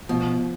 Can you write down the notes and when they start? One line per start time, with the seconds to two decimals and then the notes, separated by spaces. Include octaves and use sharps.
0.09 B2 F3